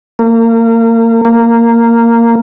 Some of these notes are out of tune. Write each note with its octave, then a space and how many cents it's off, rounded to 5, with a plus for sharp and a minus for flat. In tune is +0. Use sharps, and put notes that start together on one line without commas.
A#3 -30
A#3 -10